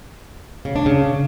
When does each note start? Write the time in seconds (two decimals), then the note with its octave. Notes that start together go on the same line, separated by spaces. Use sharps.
0.65 C#3
0.76 D4
0.86 C#3